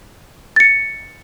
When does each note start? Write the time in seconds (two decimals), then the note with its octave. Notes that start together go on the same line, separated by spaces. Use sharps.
0.56 A6 C#7